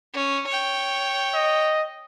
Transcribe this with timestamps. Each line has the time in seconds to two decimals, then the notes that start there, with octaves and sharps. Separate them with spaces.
0.13 C#4
0.47 C#5 G5
1.35 D#5